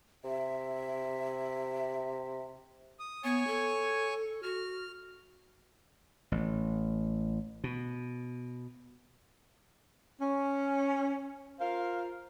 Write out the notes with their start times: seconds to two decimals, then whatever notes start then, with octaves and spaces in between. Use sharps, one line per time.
0.24 C3 E5
3.00 D#6
3.24 B3 C#5 G#5 C#6
3.47 A4
4.43 F#4 F6
6.32 A1
7.64 B2
10.20 C#4
11.59 F4 A#4 C5 F5